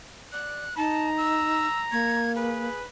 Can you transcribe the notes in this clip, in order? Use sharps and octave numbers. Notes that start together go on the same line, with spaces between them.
D5 F#6
D#4 A5 A#5
E6
A#3 G#6
G#4 B4